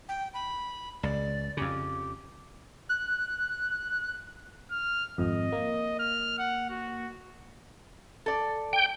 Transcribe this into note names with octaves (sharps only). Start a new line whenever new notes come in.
G5
B5
C#2 D5
F2 C#3 G4
F#6
F6
G#1 F2 D#5
A#3
F6
F#5
F#4
A4 D5
G5